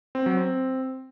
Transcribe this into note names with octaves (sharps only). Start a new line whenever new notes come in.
C4
F#3
C4